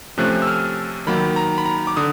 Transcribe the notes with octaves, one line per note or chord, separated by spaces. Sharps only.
C3 F3 A3 C#4 F#6
E6
F6
D#3 F#3 A#3 D#4 B5
A#5
B5
A#5
D6
D3 D#6